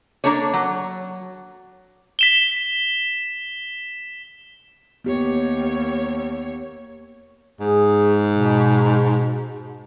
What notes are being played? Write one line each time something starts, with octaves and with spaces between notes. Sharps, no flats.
A#3 D4 A4 C#5
F#3
B6 E7 G7
D#2 B3 G4 C#5
G#2 G#4
B2